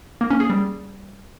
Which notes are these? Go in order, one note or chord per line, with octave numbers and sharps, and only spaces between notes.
A#3
C#4
G#4
G3